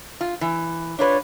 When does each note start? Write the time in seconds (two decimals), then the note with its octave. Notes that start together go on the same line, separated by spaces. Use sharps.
0.21 F4
0.41 E3
0.99 D4 F4 B4 C#5